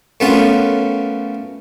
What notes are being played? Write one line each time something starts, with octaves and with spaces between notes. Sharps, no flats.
F#2 A3 B3 C#4 F4